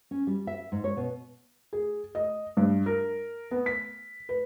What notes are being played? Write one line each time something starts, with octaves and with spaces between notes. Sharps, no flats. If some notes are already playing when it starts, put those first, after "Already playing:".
C#4
G3
E5
G#2
C#5
B2
G#4
D#5
G2
A#4
B3
B6
B4